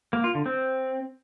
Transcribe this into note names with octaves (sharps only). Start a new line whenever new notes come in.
A#3
F4
D3
C4